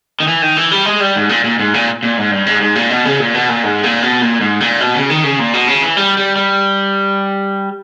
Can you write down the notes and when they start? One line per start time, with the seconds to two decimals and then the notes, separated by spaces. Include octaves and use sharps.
0.20 D#3
0.28 E3
0.42 D#3
0.57 E3
0.71 G3
0.86 G#3
1.00 G3
1.15 G#2
1.29 A#2
1.44 A#2
1.59 G#2
1.74 A#2
2.03 A#2
2.18 G#2
2.31 G2
2.46 G#2
2.61 G#2
2.75 A#2
2.90 B2
3.05 C#3
3.20 A#2
3.34 B2
3.49 A#2
3.64 G#2
3.83 A#2
4.03 B2
4.21 A#2
4.41 G#2
4.60 A#2
4.80 B2
4.95 C#3
5.10 D#3
5.24 C#3
5.39 A#2
5.53 B2
5.68 C#3
5.82 E3
5.97 G3
6.17 G3
6.36 G3